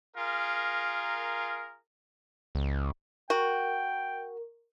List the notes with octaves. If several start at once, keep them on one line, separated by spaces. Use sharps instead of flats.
F4 G#4 A#4
C#2
F#4 A#4 G5